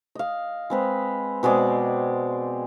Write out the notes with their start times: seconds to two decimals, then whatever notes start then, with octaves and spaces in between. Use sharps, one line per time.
0.15 D#5 F5
0.70 G#3 C4 B4
1.43 B2 G#3 C4 D5